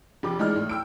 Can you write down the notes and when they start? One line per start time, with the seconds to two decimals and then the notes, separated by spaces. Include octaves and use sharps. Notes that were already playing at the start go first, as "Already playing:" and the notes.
0.23 F1 G4 D6
0.39 E3 G#3 D#4 D5 F6
0.56 A2
0.69 G5 E6 D7